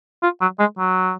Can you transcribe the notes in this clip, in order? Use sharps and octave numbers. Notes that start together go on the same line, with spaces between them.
F4
F#3
G#3
F#3